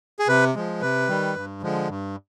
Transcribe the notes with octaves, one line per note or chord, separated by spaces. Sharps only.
G#4
C3 B4
F3 G#3
C3 B4
D#3 G3
G2
D3 F3 G#3
G2